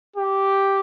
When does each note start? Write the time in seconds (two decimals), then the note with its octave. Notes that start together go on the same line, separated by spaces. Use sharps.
0.16 G4